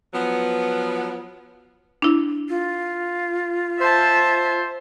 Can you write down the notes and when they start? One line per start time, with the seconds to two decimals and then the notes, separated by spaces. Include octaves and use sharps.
0.13 F3 F#3 B3
2.02 D4 E4
2.49 F4
3.80 C5 E5 A5